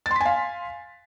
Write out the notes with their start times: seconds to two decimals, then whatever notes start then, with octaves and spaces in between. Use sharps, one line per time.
0.06 A6
0.11 C6
0.16 B6
0.21 G#5
0.26 F5